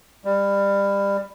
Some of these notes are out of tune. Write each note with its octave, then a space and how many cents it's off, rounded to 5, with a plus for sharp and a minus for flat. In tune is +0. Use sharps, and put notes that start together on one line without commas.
G3 +25